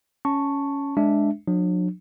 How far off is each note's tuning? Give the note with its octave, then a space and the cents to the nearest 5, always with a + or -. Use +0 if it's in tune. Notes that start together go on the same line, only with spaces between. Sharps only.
C#4 +5 A5 +0 C#6 +0
G#3 +10 D4 +0 E5 +0
F#3 -40 D4 +30